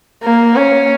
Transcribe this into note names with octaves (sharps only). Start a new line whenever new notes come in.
A#3
C#4